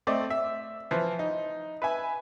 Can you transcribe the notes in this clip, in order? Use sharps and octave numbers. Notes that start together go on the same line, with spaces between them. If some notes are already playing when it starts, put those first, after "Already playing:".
A3 C4 D5 D#5
E5
E3 F3
D#4
B4 E5 G#5